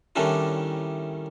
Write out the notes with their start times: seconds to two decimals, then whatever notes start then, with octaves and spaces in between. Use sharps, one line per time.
0.16 A2 D#3 G3 C#4 D4 E4